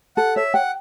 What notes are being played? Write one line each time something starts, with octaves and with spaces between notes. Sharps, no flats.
A4 F#5
C#5 E5
F#5 G5